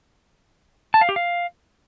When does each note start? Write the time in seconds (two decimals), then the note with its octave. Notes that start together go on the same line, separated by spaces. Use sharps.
0.94 A5
1.01 F5
1.09 G4
1.16 F5